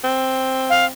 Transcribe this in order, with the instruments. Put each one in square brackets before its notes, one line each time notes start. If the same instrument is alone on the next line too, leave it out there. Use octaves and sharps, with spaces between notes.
[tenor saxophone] C4
[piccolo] F5